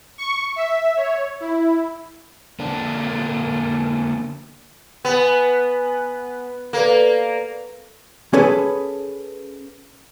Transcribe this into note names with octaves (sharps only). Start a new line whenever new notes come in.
C#6
E5
C#5
E4
D3 A#3 D4
B3 G#5
A#3 A4 B4 D5
C#4 G#4 A4 B4